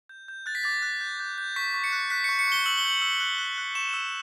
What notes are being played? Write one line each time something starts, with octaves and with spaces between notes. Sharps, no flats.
G6
G6
F#6 A6
B6
D6 A6
F#6
G6
G6
G6
C#6 B6
C#6
C#7
F#6
F#6 B6
C#7
C#6
C#7
C#6 G7
E6 F#7
G7
G6 F#7
E6
F#6
F#6
F#6
C#6 E7
E6